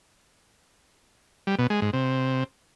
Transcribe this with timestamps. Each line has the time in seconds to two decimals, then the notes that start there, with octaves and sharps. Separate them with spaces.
1.47 G3
1.59 B2
1.70 G#3
1.82 G#2
1.93 C3